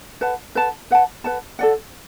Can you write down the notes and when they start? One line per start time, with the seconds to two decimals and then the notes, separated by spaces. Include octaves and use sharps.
0.21 B4 F#5 A5
0.55 B4 F#5 A5
0.91 B4 F#5 A5
1.24 B4 F#5 A5
1.59 A4 D5 F#5